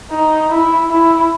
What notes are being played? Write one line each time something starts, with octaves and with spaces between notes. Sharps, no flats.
D#4
E4
E4